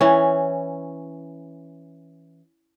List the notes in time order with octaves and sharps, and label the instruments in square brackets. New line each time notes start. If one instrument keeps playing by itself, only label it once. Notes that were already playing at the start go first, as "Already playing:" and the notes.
[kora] E3 C#4